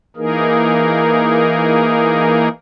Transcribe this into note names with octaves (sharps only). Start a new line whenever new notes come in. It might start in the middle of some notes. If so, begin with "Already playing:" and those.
E3 A#3 D#4 G#4 A#4